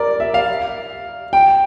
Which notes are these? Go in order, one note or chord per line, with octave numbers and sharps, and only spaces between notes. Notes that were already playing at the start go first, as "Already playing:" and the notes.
Already playing: A#4 D5
E5
F5
G5